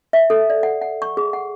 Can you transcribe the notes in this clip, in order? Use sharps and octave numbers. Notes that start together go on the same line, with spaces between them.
E5
A4
D5
F#5
F#5
C#6
G#4
F#5